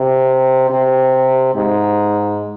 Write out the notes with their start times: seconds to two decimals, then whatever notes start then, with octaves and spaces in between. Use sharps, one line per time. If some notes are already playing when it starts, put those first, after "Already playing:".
Already playing: C3
0.70 C3
1.55 G#2